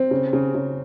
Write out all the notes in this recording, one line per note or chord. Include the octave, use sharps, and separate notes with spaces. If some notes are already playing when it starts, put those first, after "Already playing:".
Already playing: C4
C#3
C#3
C#3